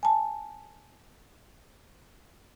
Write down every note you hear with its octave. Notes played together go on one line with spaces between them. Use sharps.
G#5 A5